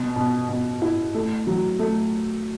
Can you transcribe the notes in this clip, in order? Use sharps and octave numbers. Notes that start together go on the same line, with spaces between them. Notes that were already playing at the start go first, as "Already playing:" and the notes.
Already playing: B2
B2
B2
E4
A3
F#3
A3